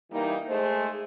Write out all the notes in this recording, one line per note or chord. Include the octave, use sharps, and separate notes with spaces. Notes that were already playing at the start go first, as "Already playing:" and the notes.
E3 G3 A#3 D#4
G#3 A3 G#4 C5